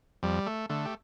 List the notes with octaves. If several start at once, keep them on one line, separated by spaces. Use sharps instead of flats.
F2 G3
A3
D3 A3
G4